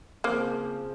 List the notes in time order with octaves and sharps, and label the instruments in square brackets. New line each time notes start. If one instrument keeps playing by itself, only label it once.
[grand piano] C#3 F3 C4 [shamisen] A#3